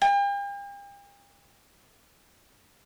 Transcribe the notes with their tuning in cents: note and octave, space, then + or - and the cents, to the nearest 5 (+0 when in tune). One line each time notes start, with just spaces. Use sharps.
G5 +40